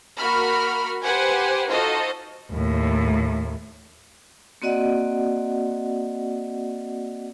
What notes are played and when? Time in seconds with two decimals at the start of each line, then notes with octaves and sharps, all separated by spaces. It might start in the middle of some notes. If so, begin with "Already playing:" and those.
0.18 A#3 F#4 A#4 B5 F6
1.04 G4 B4 C5 F#5 G#5
1.69 D#4 F4 F#4 A4 C5 D#5
2.52 D#2 A2
4.62 A#3 C4 F#4 D5 D#5 F#5